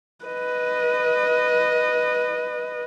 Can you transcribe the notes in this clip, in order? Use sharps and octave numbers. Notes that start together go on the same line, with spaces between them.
B4 D#5